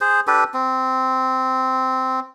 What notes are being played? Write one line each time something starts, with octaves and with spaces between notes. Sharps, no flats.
G#4 C5
D4 G4 A4 B4
C4